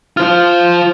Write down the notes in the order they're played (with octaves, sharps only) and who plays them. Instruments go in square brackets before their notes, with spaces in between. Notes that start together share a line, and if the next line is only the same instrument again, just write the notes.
[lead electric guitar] F4 C5 [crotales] F6